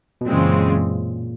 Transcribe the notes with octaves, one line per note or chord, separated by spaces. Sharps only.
B2
F#2 A#2 C#3 E3 G#3 C4